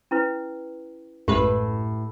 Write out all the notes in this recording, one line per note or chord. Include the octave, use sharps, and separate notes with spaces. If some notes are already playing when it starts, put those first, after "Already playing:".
C#4 E4 B4
A1 F#2 A2 G#3 G4 B4